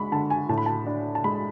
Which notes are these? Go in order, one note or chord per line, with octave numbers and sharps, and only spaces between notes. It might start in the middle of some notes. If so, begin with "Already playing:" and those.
Already playing: G#3 D4 B5 C#6
D3 A5
G#5
A2 A5
B5
A5
D4
A5
G#3 B5